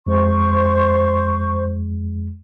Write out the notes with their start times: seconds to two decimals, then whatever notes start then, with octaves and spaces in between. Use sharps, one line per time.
0.07 F2 G#3 C5 C#6